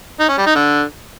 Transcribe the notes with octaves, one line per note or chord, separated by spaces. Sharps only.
D#4
C#4
G3
D#4
D3